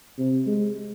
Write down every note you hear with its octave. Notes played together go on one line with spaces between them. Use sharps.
C3
G#3